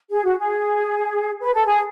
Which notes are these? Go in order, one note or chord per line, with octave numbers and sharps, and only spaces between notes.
G#4
F#4
G#4
B4
A4
G#4